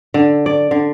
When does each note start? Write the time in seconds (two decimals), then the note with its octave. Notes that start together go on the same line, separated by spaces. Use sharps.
0.14 D3
0.46 D5
0.71 D3